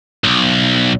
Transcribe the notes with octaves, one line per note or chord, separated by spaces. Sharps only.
B1